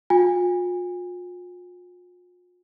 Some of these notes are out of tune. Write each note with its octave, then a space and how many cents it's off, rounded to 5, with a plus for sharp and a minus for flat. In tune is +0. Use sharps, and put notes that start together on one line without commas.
F4 +40 G#5 -30